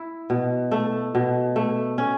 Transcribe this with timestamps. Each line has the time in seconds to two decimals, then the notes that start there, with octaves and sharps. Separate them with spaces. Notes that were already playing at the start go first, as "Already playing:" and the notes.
Already playing: E4
0.30 B2
0.72 A3
1.15 B2
1.56 A3
1.98 C#4